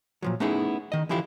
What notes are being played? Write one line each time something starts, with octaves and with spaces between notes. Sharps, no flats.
A#2 F3 F#3
A3 B3 C#4 D#4 E4 G#4
D#3 D#5
D3 E3 F3 E4 F4 G4